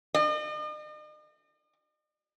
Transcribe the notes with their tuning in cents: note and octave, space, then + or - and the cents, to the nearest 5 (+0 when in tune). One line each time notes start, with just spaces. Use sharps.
D#5 -40